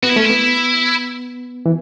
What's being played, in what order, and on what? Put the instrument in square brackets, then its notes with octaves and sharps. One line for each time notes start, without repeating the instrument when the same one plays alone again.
[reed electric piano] B3 [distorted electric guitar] F#4
[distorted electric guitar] E4
[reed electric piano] A3 [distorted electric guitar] C#4
[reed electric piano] B3 [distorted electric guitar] E4
[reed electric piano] E3